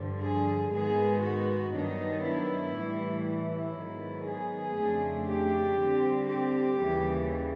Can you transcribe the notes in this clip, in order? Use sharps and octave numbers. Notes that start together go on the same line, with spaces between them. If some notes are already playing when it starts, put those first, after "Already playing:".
Already playing: G2 D3 F3
G#4
G#2 D#3 G#3 B3 D#4 G#4
F#4
G2 D#3 F#3 B3 D4 D#4
E4
A2 E3 G3
E4
G#2 D#3 F#3 B3
G#4
F2 C#3 F3 A3 D4
G4
D3 G3 C4
G4
D#2 C#3 E3 G3